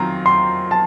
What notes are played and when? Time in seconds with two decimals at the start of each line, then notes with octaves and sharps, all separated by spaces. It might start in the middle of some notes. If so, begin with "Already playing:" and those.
Already playing: D#3 F#3 C4 F4 A#5
0.26 C6
0.71 A5